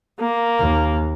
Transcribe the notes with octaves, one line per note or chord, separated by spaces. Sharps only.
A#3
D#2